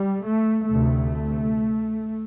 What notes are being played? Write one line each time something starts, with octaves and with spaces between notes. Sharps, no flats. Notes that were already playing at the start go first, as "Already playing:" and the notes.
Already playing: G3
A3
D2 C3 A3